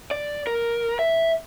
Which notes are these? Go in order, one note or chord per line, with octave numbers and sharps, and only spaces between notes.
D5
A#4
E5